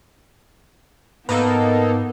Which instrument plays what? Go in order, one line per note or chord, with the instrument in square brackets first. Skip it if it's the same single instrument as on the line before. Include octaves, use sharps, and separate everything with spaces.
[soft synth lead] G#2 [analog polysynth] A#3 D#4 A4 [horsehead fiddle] B3 [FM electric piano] B4